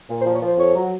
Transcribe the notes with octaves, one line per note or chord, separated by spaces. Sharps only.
A#2
C5
F3
C#5
F3 C5
F2 C#5
F#3